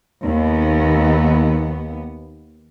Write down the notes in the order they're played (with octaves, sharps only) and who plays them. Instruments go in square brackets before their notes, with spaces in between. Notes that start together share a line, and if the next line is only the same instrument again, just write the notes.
[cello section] D#2 B3